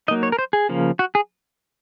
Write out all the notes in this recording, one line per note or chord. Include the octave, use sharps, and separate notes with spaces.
F#3 A#3 D#4 D#5
C#5
A#4
C5
G#4
C#3 F3 A#3
F#4
G#4